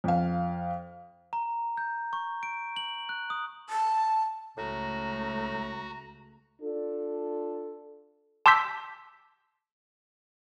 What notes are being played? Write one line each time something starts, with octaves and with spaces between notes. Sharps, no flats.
F2 F5
A#5
G6
C#6
D7
F#7
F#6
D#6
A5
C#2 A2 A3 F#4 A#5
D4 F4 A4
A5 C6 D6 E6 G6 B6